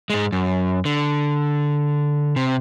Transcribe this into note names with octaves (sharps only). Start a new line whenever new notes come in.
G#2 G#3
F#2
D3
C3